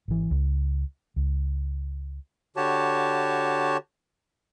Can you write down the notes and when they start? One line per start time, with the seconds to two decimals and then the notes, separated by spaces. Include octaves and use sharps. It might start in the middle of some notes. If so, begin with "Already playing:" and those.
0.08 G#1 E3
0.31 C#2
1.16 C#2
2.56 D3 F#4 G4 C#5 A5